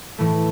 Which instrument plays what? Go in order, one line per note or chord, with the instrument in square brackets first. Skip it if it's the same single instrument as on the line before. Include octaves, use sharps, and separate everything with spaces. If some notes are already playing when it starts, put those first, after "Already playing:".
[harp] A2 E3 A3